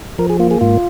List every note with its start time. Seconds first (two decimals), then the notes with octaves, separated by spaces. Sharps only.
0.19 F3 A#4
0.30 G#4
0.39 A#3 F4
0.51 G#4
0.61 G#2 F4